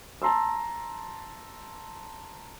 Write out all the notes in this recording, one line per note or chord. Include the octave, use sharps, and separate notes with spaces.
A5 A#5 C6 E6